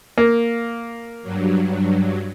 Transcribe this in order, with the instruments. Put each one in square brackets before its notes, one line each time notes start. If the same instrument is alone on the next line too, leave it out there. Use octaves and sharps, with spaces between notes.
[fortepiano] A#3
[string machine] G2 F#3